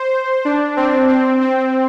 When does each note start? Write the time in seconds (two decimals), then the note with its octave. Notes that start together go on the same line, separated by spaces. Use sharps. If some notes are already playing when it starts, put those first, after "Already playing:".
Already playing: C5
0.45 D4
0.77 C4
1.09 C4
1.41 C4